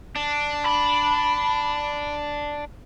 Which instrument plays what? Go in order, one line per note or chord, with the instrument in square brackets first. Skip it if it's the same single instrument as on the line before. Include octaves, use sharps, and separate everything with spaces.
[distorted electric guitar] D4
[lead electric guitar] B5